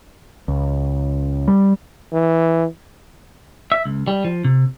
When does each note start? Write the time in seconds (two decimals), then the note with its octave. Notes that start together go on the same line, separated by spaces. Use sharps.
0.48 C#2
1.48 G3
2.12 E3
3.72 E5
3.85 C#2
4.07 G3
4.25 F3
4.44 C3